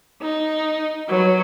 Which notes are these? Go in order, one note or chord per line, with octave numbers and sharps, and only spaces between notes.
D#4
F#3 B4